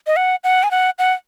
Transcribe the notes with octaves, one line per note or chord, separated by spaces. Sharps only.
D#5
F#5
F#5
G#5
F#5
F#5